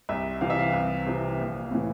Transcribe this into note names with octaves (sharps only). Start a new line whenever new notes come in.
C2 E5
C3 E3 F5
E5
F5
C2
C3 E3
A#1
A2 E3